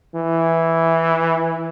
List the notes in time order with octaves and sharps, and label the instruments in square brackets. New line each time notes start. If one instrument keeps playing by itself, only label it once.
[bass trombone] E3